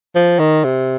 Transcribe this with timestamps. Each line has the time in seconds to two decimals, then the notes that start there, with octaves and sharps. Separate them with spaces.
0.15 F3
0.39 D#3
0.64 C3